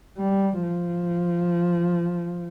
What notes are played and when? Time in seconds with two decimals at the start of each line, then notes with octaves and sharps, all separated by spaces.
0.17 G3
0.63 F3